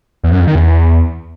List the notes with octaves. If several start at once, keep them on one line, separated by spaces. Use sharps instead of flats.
E2
F#2
F2
D#3
E2